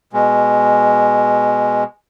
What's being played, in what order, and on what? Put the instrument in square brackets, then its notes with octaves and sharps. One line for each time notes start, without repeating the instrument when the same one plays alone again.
[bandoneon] B2 G#3